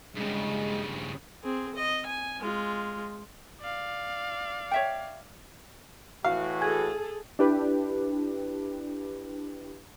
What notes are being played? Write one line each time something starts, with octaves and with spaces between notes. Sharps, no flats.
G2 C#3 G#3
C4 G#4
D#5
G#5
G#3 F4
D5 F5
C#5 E5 G5
A2 E3 F#4 F5
G#4 A4 G#5 G#6
D4 E4 G4 B4